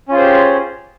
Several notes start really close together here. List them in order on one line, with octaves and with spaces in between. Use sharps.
C#4 F4 G#4 C5 G4